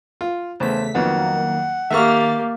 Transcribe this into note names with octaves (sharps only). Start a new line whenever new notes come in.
F4
E2 C#3 A3 C5 B6
F2 D#3 F#3 A#3 B3 F#5
D#3 A#3 G4 E5 C#6 F6 A6